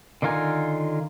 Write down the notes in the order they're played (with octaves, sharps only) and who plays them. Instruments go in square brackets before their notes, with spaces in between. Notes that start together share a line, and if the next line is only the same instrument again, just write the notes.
[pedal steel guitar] D3 D#3 F4 A#4 G#5